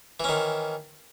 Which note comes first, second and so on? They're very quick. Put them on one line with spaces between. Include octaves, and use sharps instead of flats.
E3 C#4 D#3